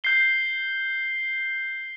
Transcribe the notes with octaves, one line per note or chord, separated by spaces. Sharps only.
G6 C7 G7